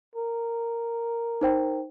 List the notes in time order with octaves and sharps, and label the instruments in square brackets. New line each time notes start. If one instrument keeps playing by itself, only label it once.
[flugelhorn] A#4
[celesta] D#4 C5 G5